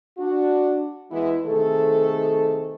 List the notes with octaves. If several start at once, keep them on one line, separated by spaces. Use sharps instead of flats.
D4 F#4
E2 E3 G#3 B3 E4
C3 D#3 A3 G#4 A4